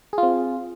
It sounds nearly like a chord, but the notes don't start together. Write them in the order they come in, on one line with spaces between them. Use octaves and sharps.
G#4 F4 C4